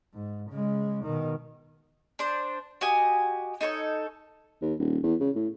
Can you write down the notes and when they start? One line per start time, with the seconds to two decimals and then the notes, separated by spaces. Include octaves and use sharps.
0.13 G#2
0.50 C#3 G#3
1.04 B2 D#3
2.19 D4 C5
2.81 F#4 G4 D#5 G#5
3.61 D#4 A4 B4 C#5
4.62 D#2
4.79 D#1
5.03 E2
5.20 C#3
5.36 A2